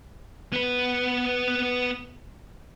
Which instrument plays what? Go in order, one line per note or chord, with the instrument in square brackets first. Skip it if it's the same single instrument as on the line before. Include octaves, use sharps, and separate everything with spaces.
[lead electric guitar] B3 B4